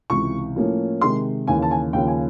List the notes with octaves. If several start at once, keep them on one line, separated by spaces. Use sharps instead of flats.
C#2 C3 E3 C#6
A2 F3 A#3 C#4
C3 D#3 G#3 C6
D#2 C#3 E3 G#5
A5
G#5
D#2 C#3 F3 G5
G#5